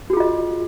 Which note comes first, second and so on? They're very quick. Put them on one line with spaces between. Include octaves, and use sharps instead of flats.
F#4 G#4 F4 D#5